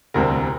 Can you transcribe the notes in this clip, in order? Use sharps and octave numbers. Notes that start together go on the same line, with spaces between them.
E1 D2 C3 G3 C4 A#4